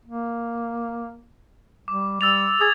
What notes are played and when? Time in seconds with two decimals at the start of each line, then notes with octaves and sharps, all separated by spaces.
0.05 A#3
1.88 G3 D6
2.21 G3 E6 A6 F7
2.61 G#4 D#6 G#6 A6